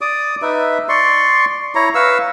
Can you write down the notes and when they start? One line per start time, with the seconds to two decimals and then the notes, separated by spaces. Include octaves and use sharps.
0.01 D5 D6 D#6
0.42 D#4 B4 E5
0.89 D5 C6 C#6
1.75 E4 C#5 A#5
1.95 B4 F5 C#6 E6